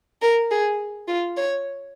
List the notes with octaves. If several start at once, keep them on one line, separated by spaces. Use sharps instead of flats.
A#4
G#4
F4
C#5